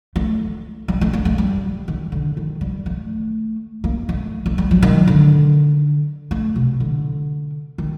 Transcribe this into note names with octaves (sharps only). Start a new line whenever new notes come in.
A3
G3
A3
A#3
A3
G3
D#3
D3
D#3
G3
A3
A#3
A3
A3
G3
F#3
D#3
D3
A3
C3
D3
D#3